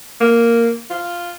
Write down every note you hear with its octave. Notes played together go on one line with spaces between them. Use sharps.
A#3
F4